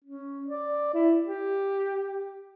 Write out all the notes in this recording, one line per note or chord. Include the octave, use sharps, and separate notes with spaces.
C#4
D5
E4
G4